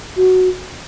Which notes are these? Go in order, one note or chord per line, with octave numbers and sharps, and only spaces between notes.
F#4